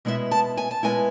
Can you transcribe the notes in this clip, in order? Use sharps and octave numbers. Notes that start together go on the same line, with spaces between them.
B2 G#3 B3 E4 E5
A5
G#5
A5
B2 G#3 B3 E4 G#5